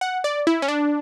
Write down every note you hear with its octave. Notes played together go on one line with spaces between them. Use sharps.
F#5
D5
E4
C#4
D4